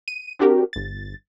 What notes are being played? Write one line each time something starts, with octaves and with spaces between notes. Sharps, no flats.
D#7
C4 D4 F#4 G4 A#4
G1 A6